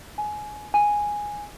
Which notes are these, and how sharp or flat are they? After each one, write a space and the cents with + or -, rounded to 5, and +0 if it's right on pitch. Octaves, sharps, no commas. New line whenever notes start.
G#5 +20
G#5 -5